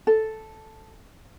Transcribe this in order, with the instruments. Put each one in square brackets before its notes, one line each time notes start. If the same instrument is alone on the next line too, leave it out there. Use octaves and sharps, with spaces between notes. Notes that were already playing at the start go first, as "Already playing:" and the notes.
[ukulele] A4